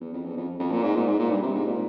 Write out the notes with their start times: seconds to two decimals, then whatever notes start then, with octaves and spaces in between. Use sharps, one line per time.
0.01 E2
0.13 F2
0.25 E2
0.37 F2
0.60 F2
0.72 A#2
0.83 G#2
0.95 A#2
1.08 G#2
1.19 A#2
1.31 G2
1.43 C3
1.55 G#2
1.66 A#2